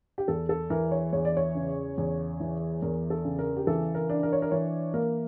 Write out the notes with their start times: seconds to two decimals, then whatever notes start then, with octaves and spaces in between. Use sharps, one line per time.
0.18 G4
0.28 E2 A4
0.49 A4
0.70 E3 A#4
0.92 C#5
1.13 E2 C#5
1.25 D5
1.37 C#5
1.55 C#3
1.98 E2
2.40 E3
2.82 E2 A#4
3.10 A4
3.25 C#3
3.39 A#4
3.57 G4
3.67 E3 A4
3.95 A#4
4.09 D4
4.23 A#4
4.33 C#5
4.42 A#4
4.51 E3 C#5
4.94 A#3 A#4